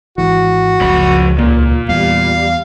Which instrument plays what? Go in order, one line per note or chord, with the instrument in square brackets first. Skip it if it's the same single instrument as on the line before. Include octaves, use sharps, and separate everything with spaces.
[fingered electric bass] G#1 G#2 E3 [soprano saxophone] F#4
[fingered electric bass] F#1 [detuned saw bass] C#2 [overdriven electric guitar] F3 B5
[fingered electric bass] D#2 [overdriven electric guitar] A#2
[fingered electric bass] E2 [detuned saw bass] G3 [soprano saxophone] F5